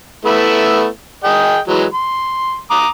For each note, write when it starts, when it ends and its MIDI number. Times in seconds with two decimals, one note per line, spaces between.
0.25 0.87 57
0.25 0.87 59
0.25 0.87 64
1.24 1.59 68
1.24 1.59 75
1.24 1.59 79
1.67 1.85 52
1.67 1.85 54
1.67 1.85 56
1.94 2.58 84
2.71 2.88 82
2.71 2.88 86
2.71 2.88 87